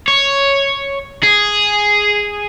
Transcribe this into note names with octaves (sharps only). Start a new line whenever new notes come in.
C#5
G#4